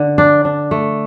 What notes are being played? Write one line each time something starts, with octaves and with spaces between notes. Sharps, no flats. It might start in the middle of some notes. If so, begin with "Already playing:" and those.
Already playing: D3
D4
D4
A3